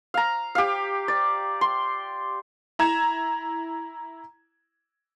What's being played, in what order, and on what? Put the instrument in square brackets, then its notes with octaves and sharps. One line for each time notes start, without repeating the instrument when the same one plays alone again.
[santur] F5 A#5
G4 F5
D5
C6
[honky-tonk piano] E4 A#5 G#6 E7